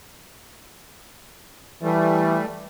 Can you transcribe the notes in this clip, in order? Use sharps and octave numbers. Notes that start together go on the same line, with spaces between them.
E3 G3 A3